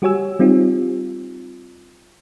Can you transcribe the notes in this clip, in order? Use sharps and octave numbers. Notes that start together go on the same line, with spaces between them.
G3 F#4 G4 C#5 G#5 E6
G3 C4 D#4 F4 G4